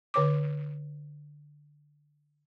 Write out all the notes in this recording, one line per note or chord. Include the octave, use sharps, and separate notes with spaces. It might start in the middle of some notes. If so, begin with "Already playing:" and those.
D3 C#5 D6